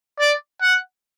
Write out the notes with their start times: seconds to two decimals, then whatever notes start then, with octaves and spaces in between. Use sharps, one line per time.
0.19 D5
0.62 F#5